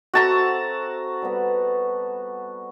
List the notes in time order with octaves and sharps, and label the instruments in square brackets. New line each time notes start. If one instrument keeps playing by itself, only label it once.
[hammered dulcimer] C4 A4 E5 [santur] F#4 A5 A#5
[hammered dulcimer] G3 B3